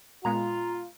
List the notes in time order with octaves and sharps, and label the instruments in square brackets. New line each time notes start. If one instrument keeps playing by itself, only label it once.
[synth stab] A#2 G#3 B3 [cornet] F4 [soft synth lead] A#5